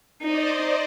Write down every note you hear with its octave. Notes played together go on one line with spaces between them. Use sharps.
D#4 C5 D5 D#5